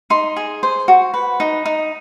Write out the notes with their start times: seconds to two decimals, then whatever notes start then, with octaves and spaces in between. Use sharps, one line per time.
0.10 D#4 C6
0.36 G#4
0.63 C5
0.88 F#4
1.14 B4
1.40 D#4
1.65 D#4